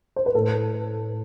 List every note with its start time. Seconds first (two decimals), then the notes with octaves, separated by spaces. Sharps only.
0.16 C5
0.26 B4
0.35 A2 A4